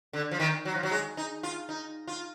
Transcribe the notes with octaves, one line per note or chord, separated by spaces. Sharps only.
D3
F3
D#3
F#3
F3
F#3
G#3
D#4
F4
D#4
F4